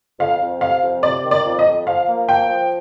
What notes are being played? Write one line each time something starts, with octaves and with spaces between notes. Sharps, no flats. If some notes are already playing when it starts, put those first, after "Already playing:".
F2 F5
F2
C3 F5
F2
C3 D5
D#3
D5
F2
D#5
F2
F3 F5
A#3
F3 G5
F3